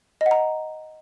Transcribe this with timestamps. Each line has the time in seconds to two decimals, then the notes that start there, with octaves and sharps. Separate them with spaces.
0.21 D#5
0.26 F#5
0.31 A#5